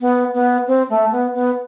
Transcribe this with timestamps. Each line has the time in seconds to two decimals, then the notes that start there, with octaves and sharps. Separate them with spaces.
0.01 B3
0.34 B3
0.67 C4
0.90 A3
1.12 B3
1.34 B3